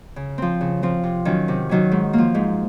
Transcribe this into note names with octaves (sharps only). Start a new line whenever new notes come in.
C#3
F3 C4
C#3
F3 C4
C3
D#3 F#3 C#4
C3
D#3 F#3 C#4
G#2
F3 A#3
G#2